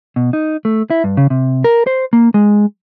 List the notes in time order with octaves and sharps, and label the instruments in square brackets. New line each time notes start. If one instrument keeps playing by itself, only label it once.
[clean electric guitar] B2
D#4
A3
E4
G2
C#3
C3
A#4
C5
A#3
G#3